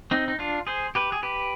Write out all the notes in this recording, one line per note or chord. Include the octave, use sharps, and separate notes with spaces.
C4 D#4
D#4
D4 F4
G#4 C5
G4 B4
G#4
G4 B4